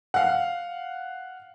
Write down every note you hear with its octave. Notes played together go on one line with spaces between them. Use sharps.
F5 F#5